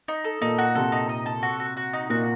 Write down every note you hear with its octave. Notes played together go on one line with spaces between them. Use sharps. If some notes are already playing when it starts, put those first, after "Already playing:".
D#4
A4
A#2 A#3 D#4
F#4
C3 C4 A4
D#4
D#5
A4
F#4
F#4
F#4
D#4
A#2 A#3 F#4